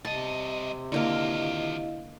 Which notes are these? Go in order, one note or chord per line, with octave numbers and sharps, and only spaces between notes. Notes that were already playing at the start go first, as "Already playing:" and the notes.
C2 C3 D#5 A5
D3 D#3 A#3 E4 F4 A#4 D#5 F5